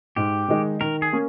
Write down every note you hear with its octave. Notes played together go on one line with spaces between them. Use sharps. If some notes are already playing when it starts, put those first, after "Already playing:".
G#2 G4
D#3 G#3 D#4
D#3 A#4
G#4
A#3 C#4